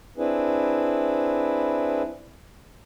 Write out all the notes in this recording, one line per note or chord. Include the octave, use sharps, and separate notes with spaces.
C4 D4 E4 G#4 B4